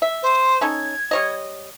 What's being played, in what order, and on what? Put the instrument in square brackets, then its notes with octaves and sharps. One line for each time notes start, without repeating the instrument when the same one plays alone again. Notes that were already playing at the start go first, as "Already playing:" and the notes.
[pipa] E5
[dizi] C5
[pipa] C#4 D#4 A4 [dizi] G#6
[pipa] G3 C#5 D#5